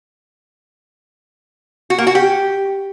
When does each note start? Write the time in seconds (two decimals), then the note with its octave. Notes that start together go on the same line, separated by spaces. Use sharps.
1.90 F#4
1.98 A#3
2.07 F#4
2.15 G4